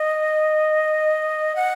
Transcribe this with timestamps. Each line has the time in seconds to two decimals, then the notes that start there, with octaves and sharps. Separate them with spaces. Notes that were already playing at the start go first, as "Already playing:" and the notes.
Already playing: D#5
1.56 F#5